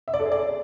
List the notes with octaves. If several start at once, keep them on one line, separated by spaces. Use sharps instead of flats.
E5
D5
A4
G#4
D5